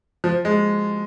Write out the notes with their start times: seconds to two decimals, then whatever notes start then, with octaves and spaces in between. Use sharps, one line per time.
0.24 F3
0.45 G#3